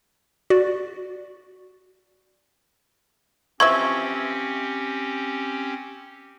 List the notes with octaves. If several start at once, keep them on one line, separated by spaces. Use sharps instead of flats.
F#4 D5
E3 F3 C4 C#4 G4 E5 C#6 G#6